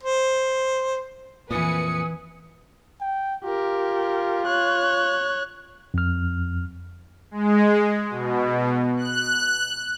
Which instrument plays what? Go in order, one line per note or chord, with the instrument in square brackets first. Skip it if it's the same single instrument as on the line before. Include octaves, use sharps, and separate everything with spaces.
[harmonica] C5
[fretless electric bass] F2 A#2 [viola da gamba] E3 [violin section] B4 G#5 C#7 [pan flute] D#6
[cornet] G5
[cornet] F4 [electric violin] G4 A#4
[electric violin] C#5 F#6
[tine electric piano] F2 F6
[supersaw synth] G#3
B2
F#6